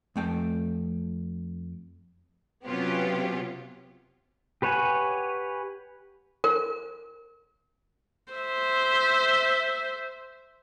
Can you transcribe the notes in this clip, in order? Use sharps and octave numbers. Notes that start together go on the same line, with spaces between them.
F2 A3 G5
C3 F#3 B3 C#4 F4 G4
G4 B4 C#5 F#5 G#5
A#4
C5 E5